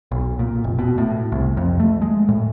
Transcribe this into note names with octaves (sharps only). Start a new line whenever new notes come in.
B1
A#2
F1
B2
A2
C2
F2
A3
G#3
A2